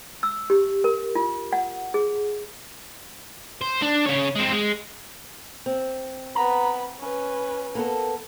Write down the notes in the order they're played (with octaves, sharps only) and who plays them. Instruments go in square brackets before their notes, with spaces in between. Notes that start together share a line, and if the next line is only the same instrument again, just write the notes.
[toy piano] E6
G4
A#4
F4
F#5
G#4
[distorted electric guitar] C5
D4
C#3 C#5
G#3 C4
G#3
[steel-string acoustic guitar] C4
[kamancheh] B3 B5 [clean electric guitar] A#5
[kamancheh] C#4 B4
[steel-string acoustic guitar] A#3 B3 A4